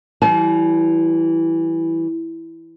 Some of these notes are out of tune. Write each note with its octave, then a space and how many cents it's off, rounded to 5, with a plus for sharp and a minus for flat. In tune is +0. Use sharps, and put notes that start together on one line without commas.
E3 +0 G3 -35 A5 -45